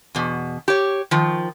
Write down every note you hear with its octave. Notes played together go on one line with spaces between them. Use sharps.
E2 B2
G4 C#5
D#3 F3